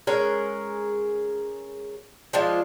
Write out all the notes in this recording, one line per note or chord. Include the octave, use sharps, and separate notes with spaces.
G#3 C#4 G#4 A#4
F3 G#3 D4 F4